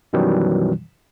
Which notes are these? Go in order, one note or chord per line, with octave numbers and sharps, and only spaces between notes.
F#2 B2 D#3 E3 F#3 G3